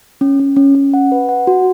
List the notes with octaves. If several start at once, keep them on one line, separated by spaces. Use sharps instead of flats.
C#4
C#4
C#4
C#4
F#5
B4
F#5
F#4